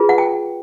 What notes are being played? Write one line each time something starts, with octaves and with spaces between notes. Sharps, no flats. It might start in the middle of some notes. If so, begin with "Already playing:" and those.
Already playing: F4 G#4 B4
F#5
G5